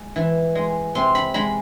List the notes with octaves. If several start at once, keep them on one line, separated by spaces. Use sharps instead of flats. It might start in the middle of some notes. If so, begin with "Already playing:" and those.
Already playing: G#3
E3
G#3
C3 C6
B5
G#3 B5